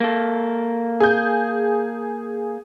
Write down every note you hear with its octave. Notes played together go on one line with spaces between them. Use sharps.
A#3 A4
G#4 G6